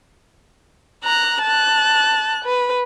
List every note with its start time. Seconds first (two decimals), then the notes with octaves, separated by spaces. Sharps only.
1.04 A#5 F#6
1.42 A5 F#6
2.45 B4